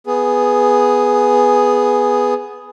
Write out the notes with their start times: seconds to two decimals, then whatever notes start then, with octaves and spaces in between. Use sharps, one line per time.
0.07 B3 G#4